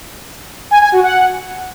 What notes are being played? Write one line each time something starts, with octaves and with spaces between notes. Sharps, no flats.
G#5
G#5
F#4
F#5